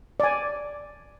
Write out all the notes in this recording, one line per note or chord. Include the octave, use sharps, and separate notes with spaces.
D5 G#5